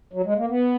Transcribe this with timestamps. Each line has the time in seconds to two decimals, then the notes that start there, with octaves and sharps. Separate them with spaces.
0.13 F#3
0.25 G#3
0.37 A#3
0.49 B3